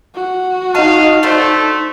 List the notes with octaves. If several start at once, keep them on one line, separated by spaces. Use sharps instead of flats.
F#4
D#4 D#5 F5 A5
A3 D4 A4 C5